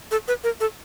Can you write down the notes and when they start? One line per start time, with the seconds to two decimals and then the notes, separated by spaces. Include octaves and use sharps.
0.11 A4
0.28 B4
0.44 A#4
0.60 A4